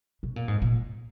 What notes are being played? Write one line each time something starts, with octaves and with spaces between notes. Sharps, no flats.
B2
A#2
G#2
A#2